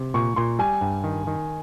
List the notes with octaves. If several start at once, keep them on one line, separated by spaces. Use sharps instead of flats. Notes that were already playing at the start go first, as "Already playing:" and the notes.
Already playing: C3
A#2 C#6
A#2 C6
G3 G#5
G2
D#3
D#3